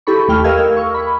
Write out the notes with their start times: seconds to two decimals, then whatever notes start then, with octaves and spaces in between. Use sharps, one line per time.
0.07 E4 G4 A4 B5 C#6
0.28 D#2 A3 G4 G5 F6
0.44 A#4 D#5 F5 E6 F6 G#6
0.77 C#6
0.94 B5